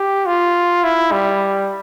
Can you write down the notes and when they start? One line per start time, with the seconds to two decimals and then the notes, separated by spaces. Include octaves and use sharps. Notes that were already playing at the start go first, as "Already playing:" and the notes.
Already playing: G4
0.26 F4
0.84 E4
1.12 G3